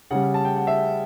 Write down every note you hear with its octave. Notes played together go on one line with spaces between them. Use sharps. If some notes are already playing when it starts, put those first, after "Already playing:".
C#3 G3 F#5
A5
G5
F#5
E5